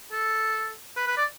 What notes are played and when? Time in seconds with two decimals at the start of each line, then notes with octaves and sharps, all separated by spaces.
0.12 A4
0.96 B4
1.07 B4
1.17 D5